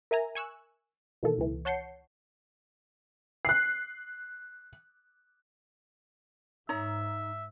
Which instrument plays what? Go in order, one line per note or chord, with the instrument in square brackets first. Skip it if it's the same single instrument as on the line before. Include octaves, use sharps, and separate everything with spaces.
[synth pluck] A#4 E5 G#5 A#5
G#5 C#6 E6 F#6
B2 D#3 E3 A#3 A4
C#2 E3
C#5 F#5 A5 G6 C7 C#7
[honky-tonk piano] F#6 C7
[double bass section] G#2 [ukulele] D#4 C#5 A#5 [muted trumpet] E5